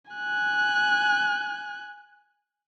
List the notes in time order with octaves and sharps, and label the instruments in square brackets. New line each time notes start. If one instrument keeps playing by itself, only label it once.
[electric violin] G#5 F#6